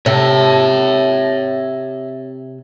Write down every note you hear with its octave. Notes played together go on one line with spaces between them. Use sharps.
C3 A4 C#5 E5